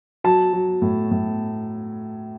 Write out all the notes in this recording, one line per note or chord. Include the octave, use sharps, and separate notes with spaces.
F#3 A5
F#3
A2
A2